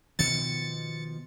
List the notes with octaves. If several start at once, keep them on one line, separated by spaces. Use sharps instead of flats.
B2 D#3 F3 A6 C#7